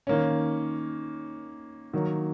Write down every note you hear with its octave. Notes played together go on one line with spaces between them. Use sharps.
D#3 A#3 C#4
D#3 F#3 A#3